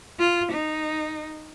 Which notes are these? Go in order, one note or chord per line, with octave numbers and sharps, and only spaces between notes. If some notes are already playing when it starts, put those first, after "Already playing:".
F4
D#4